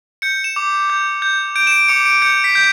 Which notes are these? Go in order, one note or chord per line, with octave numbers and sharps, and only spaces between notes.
G6 C#7
E7
D6
G6
G6
G6 D7
E7
D7
D6 C#7
D7
G6 C#7
B6
G6